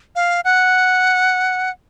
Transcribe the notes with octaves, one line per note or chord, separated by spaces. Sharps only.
F5
F#5